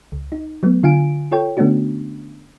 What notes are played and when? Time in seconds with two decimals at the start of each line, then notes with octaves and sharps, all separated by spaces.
0.12 C#2
0.32 D#4
0.63 F#3 A3 B3
0.83 D3 F4 F5 G#5 D7
1.32 F4 A4 C#5 G5
1.57 D3 A3 B3 C#4 D4 F#4